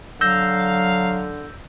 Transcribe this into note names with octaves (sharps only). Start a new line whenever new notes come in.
D3 F#3 F5 E6 G6 A#6